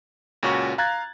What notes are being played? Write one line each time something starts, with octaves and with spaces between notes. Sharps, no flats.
C#2 A#2 C#4 F#4 C#6
F5 A#5 F#6 G#6 A6